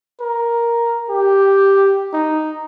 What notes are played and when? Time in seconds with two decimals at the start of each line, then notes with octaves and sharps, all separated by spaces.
0.21 A#4
1.10 G4
2.13 D#4